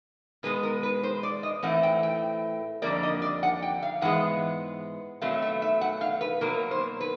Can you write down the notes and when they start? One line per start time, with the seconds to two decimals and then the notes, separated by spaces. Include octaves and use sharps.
0.43 B2 G#3 B3 B4
0.63 A#4
0.83 B4
1.03 C5
1.23 D5
1.43 D#5
1.62 A2 E3 A3 C4 F#5
1.83 G5
2.03 G5
2.82 F2 D3 G3 A#3 D5
3.03 D#5
3.22 D5
3.43 F#5
3.62 G5
3.82 F5
4.01 G#2 E3 G#3 B3 F#5
5.21 B2 F#3 A3 C4 F5
5.42 E5
5.62 E5
5.81 F#5
6.01 F5
6.21 B4
6.41 B2 F#3 A#3 A#4
6.71 C5
7.00 B4